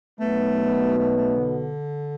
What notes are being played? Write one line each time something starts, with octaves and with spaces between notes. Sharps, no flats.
B1 B2 F#3 A3 B3
A3
A3
D3